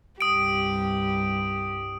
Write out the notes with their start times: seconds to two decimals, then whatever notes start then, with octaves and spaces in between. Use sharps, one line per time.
0.21 C2 G2 G4 D#6 D7